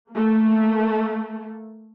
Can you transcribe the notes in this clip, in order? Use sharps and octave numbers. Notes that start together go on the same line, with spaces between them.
A3 A#3